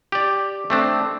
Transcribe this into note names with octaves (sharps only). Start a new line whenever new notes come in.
G4 D5
A3 C4 D4